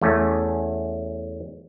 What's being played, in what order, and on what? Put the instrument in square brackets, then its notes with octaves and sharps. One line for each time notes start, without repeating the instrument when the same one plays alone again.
[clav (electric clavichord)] E2 A3 C#4